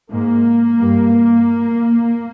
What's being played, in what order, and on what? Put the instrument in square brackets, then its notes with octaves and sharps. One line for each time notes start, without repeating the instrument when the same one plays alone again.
[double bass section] G#2 A#3
G2